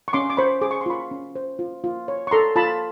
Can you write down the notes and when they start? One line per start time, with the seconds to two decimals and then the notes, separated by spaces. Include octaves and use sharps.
0.08 C#6
0.13 C#4 C6 D6
0.30 D6
0.37 C5 B5 C#6
0.61 G#4 D6
0.71 C#6
0.81 C6
0.86 F4 B5 C#6
1.11 C#4
1.36 C5
1.59 F4
1.84 F4
2.08 C#5
2.27 C#6
2.31 A4 A#5 C6
2.56 F4 A5 B5